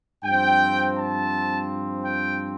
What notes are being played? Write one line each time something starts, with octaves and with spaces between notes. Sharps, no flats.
G2 F3 C4 G5
A5
G5